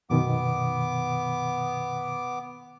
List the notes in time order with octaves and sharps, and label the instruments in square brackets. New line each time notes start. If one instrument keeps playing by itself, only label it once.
[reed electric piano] F#2 B2 D#3 [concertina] B3 D6